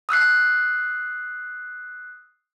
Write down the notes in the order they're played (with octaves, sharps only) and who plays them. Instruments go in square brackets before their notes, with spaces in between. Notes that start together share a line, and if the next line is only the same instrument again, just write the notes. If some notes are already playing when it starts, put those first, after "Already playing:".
[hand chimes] D#6 E6 F#6 C7